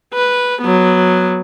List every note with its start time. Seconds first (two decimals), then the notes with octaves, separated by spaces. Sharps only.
0.14 B4
0.61 F#3 B3